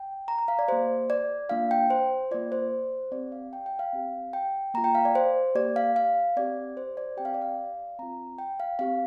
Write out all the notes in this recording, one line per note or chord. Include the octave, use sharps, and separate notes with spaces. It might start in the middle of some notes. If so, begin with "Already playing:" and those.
Already playing: G5
A#5
A#5
F5
D5
A#3 G4 C5
D5
A#3 D4 F4 F5
G5
C5
A#3 F4 D5
C5
C4 G4 D5
F5
G5
G5
F5
C4 G4
G5
A#3 F4 A#5
G5
F5
D5
C5
A#3 G4 D5
F5
F5
C4 G4 D5
C5
D5
C4 G4 G5
F5
D5
F5
C4 F4 A#5
G5
F5
C4 G4 F5